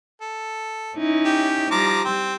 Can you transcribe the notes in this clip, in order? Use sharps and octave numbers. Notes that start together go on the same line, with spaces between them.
A4
C#4 D#4 E4
G4
F3 G3 A#5 D6
C4